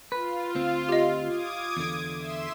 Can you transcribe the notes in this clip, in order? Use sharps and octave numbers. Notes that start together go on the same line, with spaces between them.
F4 B4
D2 C4
G4 D#5
D6 D#6 G#6
E2 D3
E5 C6 E7